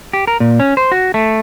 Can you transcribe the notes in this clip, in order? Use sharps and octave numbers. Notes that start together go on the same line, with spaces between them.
G4
A#4
A#2
C#4
C5
F#4
A3